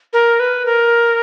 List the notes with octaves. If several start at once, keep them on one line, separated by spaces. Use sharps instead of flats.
A#4
B4
A#4